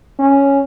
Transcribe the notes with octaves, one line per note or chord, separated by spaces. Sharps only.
C#4